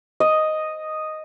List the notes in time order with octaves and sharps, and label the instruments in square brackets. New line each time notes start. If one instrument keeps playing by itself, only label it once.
[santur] D#5